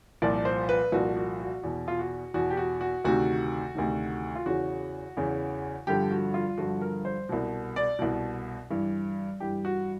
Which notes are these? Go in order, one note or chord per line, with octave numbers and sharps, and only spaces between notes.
C2 A#2 F3 D5
C5
B4
C2 A#2 F3 F#4
F#4
F#4
E2 B2
F4
F#4
E2 B2 F#4
G4
F#4
F#4
D2 C3 D#3 F#4
D2 C3 D#3
F4
E2 C#3 E3 F#4
E2 C#3 E3
G2 D3 F3 G4
F#4
F4
G2 D3 F3 F#4
A#4
C5
C2 B2
D5
C2 B2
G2 E3
G2 E3 G4
F#4